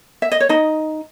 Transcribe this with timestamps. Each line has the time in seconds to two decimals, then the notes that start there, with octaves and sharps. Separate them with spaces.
0.22 E5
0.32 D#5
0.40 C#5
0.49 D#4 D#5